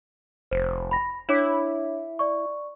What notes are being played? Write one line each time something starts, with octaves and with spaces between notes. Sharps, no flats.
F1 C5
B5 A#6
D4 E4 C#5 D6
D5 C#6